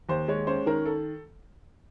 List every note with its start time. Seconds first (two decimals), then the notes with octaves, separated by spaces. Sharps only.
0.09 D#2 C5
0.28 G#3 C#5
0.47 C#4 C5
0.66 D#3 A#4
0.86 A4